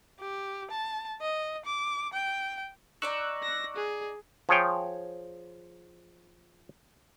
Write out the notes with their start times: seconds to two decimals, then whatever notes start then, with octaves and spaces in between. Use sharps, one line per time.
0.20 G4
0.71 A5
1.21 D#5
1.65 D6
2.13 G5
3.02 D#4 D5 A#5 C#6 E6 F#6
3.43 A#6
3.76 G#4
4.49 F3 G#4 C#5 G5